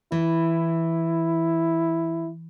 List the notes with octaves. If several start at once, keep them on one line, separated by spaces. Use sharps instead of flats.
E3 E4